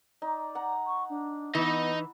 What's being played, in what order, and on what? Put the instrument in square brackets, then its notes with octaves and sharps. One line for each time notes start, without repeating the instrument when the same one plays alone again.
[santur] D#4 [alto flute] D5
[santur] F#5 A#5
[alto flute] C#6
D4
[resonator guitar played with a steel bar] E3 [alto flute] B3 [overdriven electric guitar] D#4 D#5